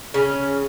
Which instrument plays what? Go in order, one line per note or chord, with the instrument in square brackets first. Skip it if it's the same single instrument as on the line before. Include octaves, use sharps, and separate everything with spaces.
[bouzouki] C#3 C#4